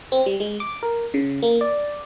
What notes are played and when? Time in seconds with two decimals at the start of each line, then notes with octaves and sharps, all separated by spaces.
0.12 C4
0.26 G3
0.40 G#3
0.60 D6
0.83 A#4
1.14 C#3
1.42 A#3
1.61 D5